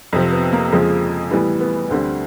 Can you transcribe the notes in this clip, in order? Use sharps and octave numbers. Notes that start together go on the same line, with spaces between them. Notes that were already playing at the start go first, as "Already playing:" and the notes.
F2 C3 F3
B3
A#3
F2 C#3 F3 G#3
A2 E3 G3 B3
B3
D2 D3 G3 C4